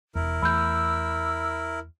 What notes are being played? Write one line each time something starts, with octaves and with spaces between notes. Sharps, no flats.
E1 E2 E4 A#4
E2 E3 A3 B5 E6 G6